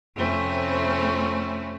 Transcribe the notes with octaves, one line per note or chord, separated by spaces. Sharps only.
F2 C3 A3 C4 C#4 E4